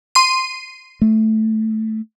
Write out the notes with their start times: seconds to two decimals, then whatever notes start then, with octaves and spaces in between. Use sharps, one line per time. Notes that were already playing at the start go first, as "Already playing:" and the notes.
0.15 C6 C7 D#7
1.02 A3